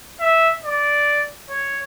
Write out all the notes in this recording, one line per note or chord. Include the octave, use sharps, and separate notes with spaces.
E5
D5
C#5